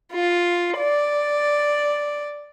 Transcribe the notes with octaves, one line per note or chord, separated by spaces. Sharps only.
F4
D5